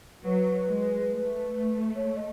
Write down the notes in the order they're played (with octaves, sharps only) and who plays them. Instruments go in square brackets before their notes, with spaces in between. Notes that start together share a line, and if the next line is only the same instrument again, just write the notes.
[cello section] F#3 [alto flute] B4
[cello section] G#3
A3
[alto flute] C#5
D#5